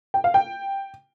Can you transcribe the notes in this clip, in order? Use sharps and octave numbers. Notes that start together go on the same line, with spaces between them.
G5
F5
G5